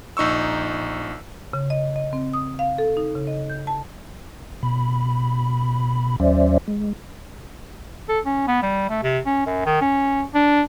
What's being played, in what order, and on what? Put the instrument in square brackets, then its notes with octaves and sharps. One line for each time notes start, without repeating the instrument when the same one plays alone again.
[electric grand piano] A#1 D#4 C#6 E6
[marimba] C#3
D#5
D#5
C4
D#6
F5
A4
D#4
C#3
D#5
G6
A5
[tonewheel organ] B2 B5
D#2 F#3 C#4 C5 D5 E5
G#3
[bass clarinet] A4
C#4
B3
G3
A3
C3
C#4
F#2
D#3
C#4
D4